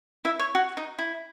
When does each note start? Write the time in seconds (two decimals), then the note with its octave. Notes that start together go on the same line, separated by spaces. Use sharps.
0.25 E4 E5
0.39 C#5
0.55 F#4
0.77 D#4
0.99 E4